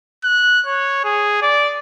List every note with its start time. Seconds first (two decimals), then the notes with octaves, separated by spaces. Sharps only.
0.24 F#6
0.66 C#5
1.04 G#4
1.42 D5